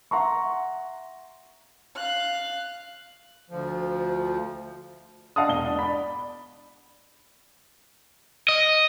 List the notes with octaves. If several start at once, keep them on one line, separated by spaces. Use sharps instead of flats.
E5 F#5 A#5 C6 C#6
F5 F#6
D2 F3
D5 D#5 F5 F#5 A5 D#6
E1 G7
D4
D5 B5
D#5